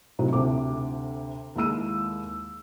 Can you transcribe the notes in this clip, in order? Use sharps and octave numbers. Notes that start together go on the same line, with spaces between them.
A2 C3 F#3 D#4 E4
D2 C3 A4 D6
D#2 G#3 E4 E6 D#7